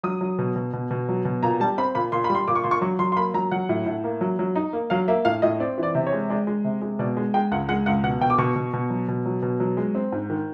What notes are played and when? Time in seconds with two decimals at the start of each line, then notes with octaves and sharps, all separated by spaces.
0.03 F#3 D#6
0.21 F#3
0.39 B2
0.56 B2
0.73 B2
0.91 B2
1.09 F#3
1.25 B2
1.43 A#2 A#5
1.60 G3 A5
1.78 C4 B5
1.95 A#2 B5
2.12 A#2 C6
2.24 G3 B5
2.35 C6
2.48 A#2 D6
2.55 C#6
2.64 A#2 C6
2.71 C#6
2.81 F#3 C#6
2.99 F#3 C6
3.12 C6
3.17 A#3 B5
3.34 F#3 A#5
3.51 F#3 F#5
3.69 A2
3.86 A2
4.04 A#3
4.21 F#3
4.39 F#3
4.55 D#4
4.73 A#3
4.90 F#3 F5
5.08 A#3 E5
5.25 A2 F5
5.42 A2 D#5
5.60 C4 D5
5.78 E3
5.83 D5
5.95 C3
6.06 C#5
6.12 G#3
6.30 G#3 D5
6.47 G#3
6.64 C3
6.82 G#3
6.99 B2 D5
7.17 G#3
7.34 G#3 G5
7.51 C#2 F#5
7.69 G#3 F#5
7.86 C#2 F#5
8.04 B2 F#5
8.21 B2 G5
8.30 D6
8.38 B2 C#6
8.56 B2
8.73 B2
8.90 F#3
9.08 B2
9.26 F#3
9.42 B2
9.60 F#3
9.77 G#3
9.95 C4
10.12 G#2
10.30 D#3